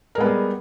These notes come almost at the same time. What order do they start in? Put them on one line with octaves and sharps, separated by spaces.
A#4 G#3 B3 G3 G#4